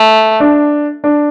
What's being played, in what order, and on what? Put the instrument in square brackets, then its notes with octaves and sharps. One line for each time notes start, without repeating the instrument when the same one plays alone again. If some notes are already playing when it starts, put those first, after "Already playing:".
Already playing: [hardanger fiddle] A3
[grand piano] D4
D4